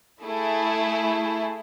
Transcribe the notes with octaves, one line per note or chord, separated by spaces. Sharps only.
A3 E4 G#4